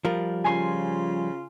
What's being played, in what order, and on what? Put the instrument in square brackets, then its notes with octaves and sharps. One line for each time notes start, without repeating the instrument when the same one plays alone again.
[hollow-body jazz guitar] F3 G3 A#4
[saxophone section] C#3 F4 [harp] G#5 C6